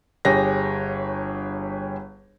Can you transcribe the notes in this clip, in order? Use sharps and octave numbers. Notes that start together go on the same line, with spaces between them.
G1 G4 G#4 C#5 A#6